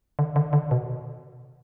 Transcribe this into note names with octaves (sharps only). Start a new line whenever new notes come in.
D3
D3
D3
B2